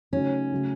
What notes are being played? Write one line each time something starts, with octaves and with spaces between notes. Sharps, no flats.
C#3 F#3 A3 C#4 D#4
C#3 F#3 A3